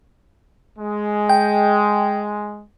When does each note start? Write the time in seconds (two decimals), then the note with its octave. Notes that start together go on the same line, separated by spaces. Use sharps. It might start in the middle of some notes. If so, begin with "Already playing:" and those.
0.78 G#3
1.29 G5